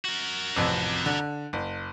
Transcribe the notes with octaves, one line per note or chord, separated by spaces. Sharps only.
F#4 A#4
A1 F2 C3
D3
F#1